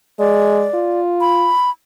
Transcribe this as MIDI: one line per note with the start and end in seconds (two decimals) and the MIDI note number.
0.19 0.67 56
0.19 1.01 74
0.74 1.52 65
1.21 1.70 83